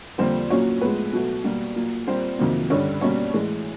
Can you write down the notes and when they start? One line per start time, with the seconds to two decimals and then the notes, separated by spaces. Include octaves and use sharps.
0.18 F2 D3 G3 A#3 C4 C5
0.50 A#2 F#3 A#3 C#4 C#5
0.81 A2 F3 G#3 B3 B4
1.13 B2 F#3 A3
1.44 B2 G3 A#3
1.76 A#2 F#3 A#3
2.07 A#2 G3 A#3 C4 C5
2.39 F2 C3 D#3 F#3 A#3
2.70 G2 D3 G3 C#4 C#5
3.01 B2 G3 A#3 C#4 C#5
3.34 A2 E3 G#3